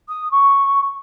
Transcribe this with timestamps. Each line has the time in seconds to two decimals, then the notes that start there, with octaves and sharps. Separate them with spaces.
0.08 D#6
0.31 C#6